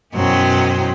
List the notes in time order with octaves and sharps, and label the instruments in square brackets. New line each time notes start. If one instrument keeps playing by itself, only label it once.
[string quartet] F#2 B2 E3 F#3 C5 G5